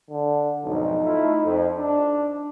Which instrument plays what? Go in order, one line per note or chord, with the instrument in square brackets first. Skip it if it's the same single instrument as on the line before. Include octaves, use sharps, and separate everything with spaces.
[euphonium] D3
[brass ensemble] B1 F2 G#2 [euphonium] D#4
[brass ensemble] A3 E4 F4
F2
D4